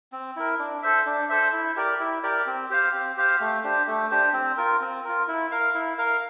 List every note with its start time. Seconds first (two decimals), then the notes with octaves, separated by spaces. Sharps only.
0.12 C4
0.36 E4 A#4
0.59 D4
0.82 A4 C5 E5
1.06 D4
1.29 A4 C5 E5
1.53 E4
1.76 G4 A#4 D5
2.00 E4
2.23 G4 A#4 D5
2.47 C4
2.70 G4 C5 F5
2.93 C4
3.17 G4 C5 F5
3.41 A3
3.64 D4 G4 C5
3.87 A3
4.11 D4 G4 C5
4.33 C4
4.57 F4 A#4
4.81 C4
5.04 F4 A#4
5.28 E4
5.51 A#4 F5
5.75 E4
5.98 A#4 F5